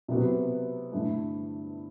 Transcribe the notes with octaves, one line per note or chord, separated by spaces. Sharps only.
C3 F#3 B3 F#4
G2 D3 A3 E4